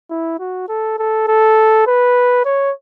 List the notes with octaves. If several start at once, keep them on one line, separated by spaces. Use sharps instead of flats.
E4
F#4
A4
A4
A4
B4
C#5